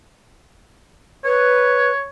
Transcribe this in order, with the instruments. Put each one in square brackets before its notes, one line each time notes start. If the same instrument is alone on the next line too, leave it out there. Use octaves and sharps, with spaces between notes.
[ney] B4 [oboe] C#5